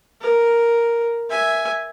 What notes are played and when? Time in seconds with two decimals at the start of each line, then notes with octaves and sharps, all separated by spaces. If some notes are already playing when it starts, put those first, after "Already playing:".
0.21 A#4
1.30 E5 G#5